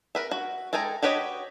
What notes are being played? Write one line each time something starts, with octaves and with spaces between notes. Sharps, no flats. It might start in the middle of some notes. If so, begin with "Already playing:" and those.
A#4 B4 E5
F#4
G#3 A4 G5 G#5 A#5
F#4 G4 B4 C#5 D#5